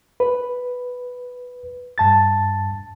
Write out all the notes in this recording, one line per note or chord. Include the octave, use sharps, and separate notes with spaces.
B4
G2 A5 A6